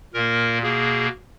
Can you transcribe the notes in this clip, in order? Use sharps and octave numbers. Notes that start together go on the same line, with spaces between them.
A#2 A#3 A#4
B2 A#3 G#4